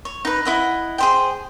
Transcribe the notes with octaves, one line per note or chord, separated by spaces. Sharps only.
C#5
D#4 B4
E4 D#5 F#5
G#4 C5 G5